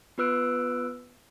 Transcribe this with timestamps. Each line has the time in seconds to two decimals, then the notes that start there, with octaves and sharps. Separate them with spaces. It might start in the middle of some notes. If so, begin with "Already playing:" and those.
0.18 B3 F4 B4 E6 F#6 D7